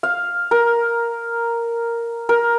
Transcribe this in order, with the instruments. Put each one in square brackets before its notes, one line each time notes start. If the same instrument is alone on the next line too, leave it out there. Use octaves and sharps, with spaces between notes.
[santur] F5
A#4
A#4